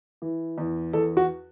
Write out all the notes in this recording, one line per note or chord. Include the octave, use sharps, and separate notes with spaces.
E3
E2
E2 A4
F#4